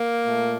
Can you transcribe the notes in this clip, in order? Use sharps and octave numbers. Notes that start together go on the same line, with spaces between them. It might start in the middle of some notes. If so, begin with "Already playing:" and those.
Already playing: A#3
A#2 A3